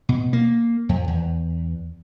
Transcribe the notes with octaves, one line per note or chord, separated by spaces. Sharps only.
B2
A#3
F2
E2